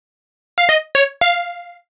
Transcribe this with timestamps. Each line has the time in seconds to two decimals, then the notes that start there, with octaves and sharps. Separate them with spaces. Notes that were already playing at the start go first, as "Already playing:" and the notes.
0.58 F5
0.69 D#5
0.95 C#5
1.21 F5